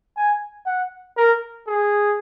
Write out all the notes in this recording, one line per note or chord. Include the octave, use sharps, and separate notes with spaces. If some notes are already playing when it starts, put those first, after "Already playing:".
G#5
F#5
A#4
G#4